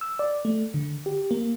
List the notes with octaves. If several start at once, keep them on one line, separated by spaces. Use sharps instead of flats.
E6
D5
A3
D3
G4
A#3